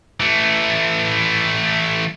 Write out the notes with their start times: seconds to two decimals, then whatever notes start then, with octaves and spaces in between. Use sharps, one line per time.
0.20 E3 A3